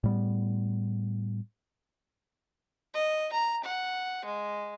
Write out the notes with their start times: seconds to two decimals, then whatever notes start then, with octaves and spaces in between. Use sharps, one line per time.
0.04 A2 G3 B3
2.94 D#5
3.33 A#5
3.64 F#5
4.25 G#3